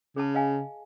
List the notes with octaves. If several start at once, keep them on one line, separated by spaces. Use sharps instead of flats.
C#3 G#4 A5
D#5 F5 G#5